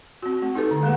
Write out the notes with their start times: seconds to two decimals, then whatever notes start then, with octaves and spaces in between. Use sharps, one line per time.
0.22 C4 F#4
0.42 A3 C4
0.55 D#4 G4 A4 B4
0.71 D3
0.83 G#3 A#3 G#4 F#5